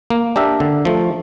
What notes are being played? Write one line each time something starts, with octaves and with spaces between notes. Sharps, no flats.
A#3
D4 G4 A#4 E5
D3
F3 A3